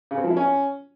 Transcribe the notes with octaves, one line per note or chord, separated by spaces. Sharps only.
C#3
C4
F3
E4
C#4